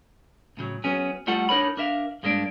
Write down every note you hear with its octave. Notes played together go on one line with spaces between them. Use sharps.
A2 C#3 F3 F#3
F#3 B3 C#4 G#4
G3 A3 F4 A4 F#5
D4 D#4 A#4 C#5 B5
D4 A#4 E5 F5
G2 G#3 A#3 B3 D4